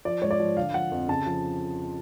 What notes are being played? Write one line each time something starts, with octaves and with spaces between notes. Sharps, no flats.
F3 D5
G#2 C#5
D5
F3
D3 F5
F3 F#5
F2
C#3 A5
F3